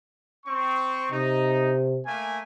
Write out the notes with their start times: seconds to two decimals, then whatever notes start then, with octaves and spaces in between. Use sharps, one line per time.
0.46 C4 C#6
1.12 C3 D#4
2.06 A3 A#3 G#5